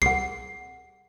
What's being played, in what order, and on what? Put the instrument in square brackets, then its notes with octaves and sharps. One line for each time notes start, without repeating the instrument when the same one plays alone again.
[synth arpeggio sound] C2 A#2 [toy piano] G#4 F#5 [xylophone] C7